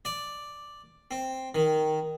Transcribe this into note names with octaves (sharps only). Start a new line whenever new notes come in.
D5
C4
D#3